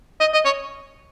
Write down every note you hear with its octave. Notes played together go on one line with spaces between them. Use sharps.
D#5
D#5
C#5